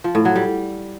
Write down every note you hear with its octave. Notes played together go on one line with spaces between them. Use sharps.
F3
A2
F#3
G3